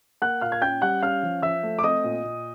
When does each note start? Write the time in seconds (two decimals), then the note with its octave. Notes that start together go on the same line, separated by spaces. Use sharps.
0.22 A#3 F#5 F#6
0.41 A#2 F5 F6
0.52 G#6
0.62 C#4 G5 G6
0.82 G3 F#5 F#6
1.02 C#4 F5 F6
1.23 F3
1.42 F3 E5 E6
1.63 A3
1.79 D6
1.84 C4 D#5 D#6
2.04 A#2
2.24 A#2